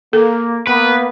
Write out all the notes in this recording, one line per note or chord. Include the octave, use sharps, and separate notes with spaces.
A#3 A4
A#3 B3 B4